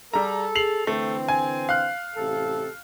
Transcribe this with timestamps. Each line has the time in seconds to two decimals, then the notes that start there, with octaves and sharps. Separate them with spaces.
0.14 G3 G#4 A4 A#5
0.56 C7 F7 F#7
0.87 D3 E3 A3 C4
1.28 G#5
1.69 F5 F#6
2.16 A1 C3 A4